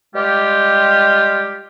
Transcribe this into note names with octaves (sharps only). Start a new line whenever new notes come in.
G3 G#3 F4 G4